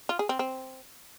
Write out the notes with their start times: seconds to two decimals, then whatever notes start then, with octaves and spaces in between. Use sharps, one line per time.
0.09 F4
0.19 G#4
0.29 C4
0.39 C4